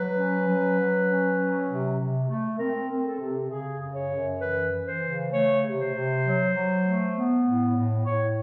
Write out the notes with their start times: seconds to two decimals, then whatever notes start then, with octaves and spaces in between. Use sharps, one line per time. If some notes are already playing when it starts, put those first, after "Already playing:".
Already playing: F#3 B4
0.16 C#4
0.45 F#3
0.76 F#3
1.07 C#4
1.37 F#3
1.68 C3
1.98 C3
2.28 A3
2.58 C4 A#4
2.89 C4
3.04 A4
3.19 C3
3.50 C#3 G#4
3.80 F#2
3.95 C#5
4.10 F#2
4.41 E3 B4
4.72 E3
4.86 C5
5.02 C#3
5.31 A3 C#5
5.62 C3
5.78 C5
5.93 C3
6.23 F#3
6.53 F#3
6.84 A3
7.15 B3
7.44 A2
7.75 A2
8.05 A2 C#5